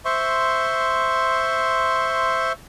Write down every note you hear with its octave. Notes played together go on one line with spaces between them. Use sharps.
C5 E5 C6 C#6